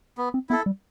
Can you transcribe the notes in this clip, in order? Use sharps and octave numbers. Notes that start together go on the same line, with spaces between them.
B3
C4
B3 E4 A4
G3